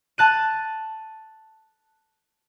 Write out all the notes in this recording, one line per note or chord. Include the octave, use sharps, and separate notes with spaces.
A5 F#6 D#7